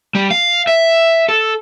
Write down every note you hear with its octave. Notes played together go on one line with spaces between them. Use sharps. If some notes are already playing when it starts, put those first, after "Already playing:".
G3
F5
E5
A4